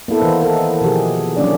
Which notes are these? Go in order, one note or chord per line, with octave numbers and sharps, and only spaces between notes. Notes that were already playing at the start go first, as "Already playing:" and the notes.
A#3 B3 E4 A4
D#3 E3 D#4 C5
D#3 D#4 A4 A#4
B2 D#3 F3 G4 G#4
D3 F#3 A#3 C#4 D4 D5